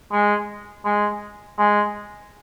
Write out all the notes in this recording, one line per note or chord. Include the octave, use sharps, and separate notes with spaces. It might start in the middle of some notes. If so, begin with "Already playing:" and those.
G#3
G#3
G#3